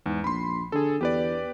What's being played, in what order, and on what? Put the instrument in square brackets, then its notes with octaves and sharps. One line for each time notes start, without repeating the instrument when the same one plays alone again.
[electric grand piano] E2 [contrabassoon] G#2
[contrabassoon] A#1 [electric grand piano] B5 C6
[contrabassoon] D3 [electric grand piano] G#4 A4
[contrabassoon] E2 [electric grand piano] G4 B4 D5